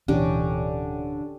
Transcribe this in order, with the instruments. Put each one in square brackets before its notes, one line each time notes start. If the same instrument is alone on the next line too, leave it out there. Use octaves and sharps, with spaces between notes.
[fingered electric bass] D1 B2 E3 [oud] D3 [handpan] C#4 D4 G4